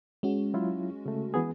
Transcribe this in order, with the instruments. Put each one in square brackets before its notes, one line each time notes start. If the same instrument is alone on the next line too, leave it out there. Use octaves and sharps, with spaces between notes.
[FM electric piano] G#3 C#4 F#4
[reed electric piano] F#3 E4 F4
C#3 A3
E3 B3 G#4